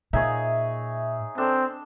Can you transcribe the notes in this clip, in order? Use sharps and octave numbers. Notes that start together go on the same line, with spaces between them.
A#2 D#4 G#4 C#5 E5
C4 D4 A4